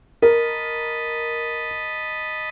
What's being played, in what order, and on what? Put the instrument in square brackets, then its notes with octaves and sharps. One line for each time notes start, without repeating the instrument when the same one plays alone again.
[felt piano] A#4 [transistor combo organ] D#5 A5 B5